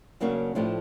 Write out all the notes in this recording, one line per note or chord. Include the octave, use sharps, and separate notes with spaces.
C#3 F#3 A#3 D4 F#4
A2 F3 A3 D4 G4